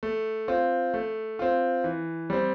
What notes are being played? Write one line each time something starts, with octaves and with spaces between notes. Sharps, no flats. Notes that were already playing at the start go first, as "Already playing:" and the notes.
A3
C4 F4
A3
C4 F4
E3
G3 C4